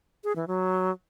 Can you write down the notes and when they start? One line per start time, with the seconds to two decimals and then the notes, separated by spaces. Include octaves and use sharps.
0.24 G#4
0.36 E3
0.48 F#3